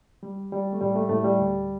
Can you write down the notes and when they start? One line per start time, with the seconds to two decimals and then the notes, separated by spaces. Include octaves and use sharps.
0.23 G3
0.52 G3
0.73 A3
0.81 A2 G3
0.96 A3
1.09 A2 A3
1.24 G3
1.39 D2